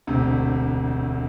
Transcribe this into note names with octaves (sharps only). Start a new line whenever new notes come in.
E1 D2 C3